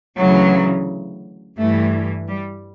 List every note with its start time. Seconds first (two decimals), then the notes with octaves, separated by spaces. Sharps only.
0.18 D2 C#3 E3 F#3
1.58 G2 E3 A3
2.28 G3